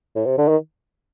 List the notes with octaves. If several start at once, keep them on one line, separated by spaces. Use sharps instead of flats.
A2
C3
D3
D#3